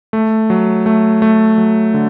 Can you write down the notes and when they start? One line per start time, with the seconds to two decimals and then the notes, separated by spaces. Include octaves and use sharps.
0.13 A3
0.50 F#3
0.86 A3
1.22 A3
1.58 F#3
1.94 D3